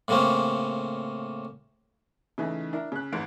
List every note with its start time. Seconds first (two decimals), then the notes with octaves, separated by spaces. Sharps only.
0.08 A2 C#3 A#3 C4 C#4
2.38 C#3 E3 A3 D#4
2.73 D4 E4 A#4
2.92 C#3 F#6
3.12 A1 F2 G#2 D7